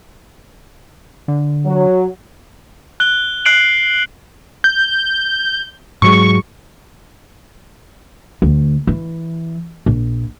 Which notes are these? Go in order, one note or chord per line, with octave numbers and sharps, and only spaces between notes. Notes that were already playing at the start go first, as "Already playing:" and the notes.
D3
F#3
F#6 G7
F#6 C7 D7 F#7
G6
G#2 F#3 G#3 C#6
D2
E3
A#1